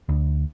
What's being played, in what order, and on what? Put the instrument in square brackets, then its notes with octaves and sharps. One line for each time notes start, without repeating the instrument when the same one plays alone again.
[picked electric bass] D2